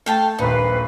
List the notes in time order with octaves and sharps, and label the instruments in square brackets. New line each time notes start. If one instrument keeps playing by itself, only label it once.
[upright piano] A3 [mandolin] F5 G5 A5
[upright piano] D#1 A#1 D#2 [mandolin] D#4 [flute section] B4 C5